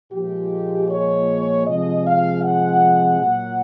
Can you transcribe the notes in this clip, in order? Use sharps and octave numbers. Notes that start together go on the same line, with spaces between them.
A#2 F3 G#3 G4
C#5
C3 F3 G#3 D#5
F5
F#5
A#2 F#3